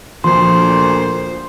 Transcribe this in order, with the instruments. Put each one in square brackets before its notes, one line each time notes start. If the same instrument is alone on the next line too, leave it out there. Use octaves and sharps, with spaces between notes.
[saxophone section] D2 A#2 [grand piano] F3 [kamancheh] C5 [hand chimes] C6